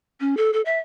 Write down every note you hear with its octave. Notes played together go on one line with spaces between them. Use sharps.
C#4
A4
A4
E5